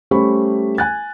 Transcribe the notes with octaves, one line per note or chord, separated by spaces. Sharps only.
G3 A3 C#4 C5 B5 C#6
G#5 F#6 A6